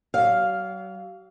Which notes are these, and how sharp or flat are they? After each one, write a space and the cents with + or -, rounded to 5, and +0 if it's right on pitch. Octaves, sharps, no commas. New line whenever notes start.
F#3 +40 F5 +0